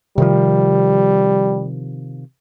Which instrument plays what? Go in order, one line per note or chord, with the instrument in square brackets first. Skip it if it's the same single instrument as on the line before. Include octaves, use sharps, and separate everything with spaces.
[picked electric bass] C3 D#3 F3 [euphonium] G3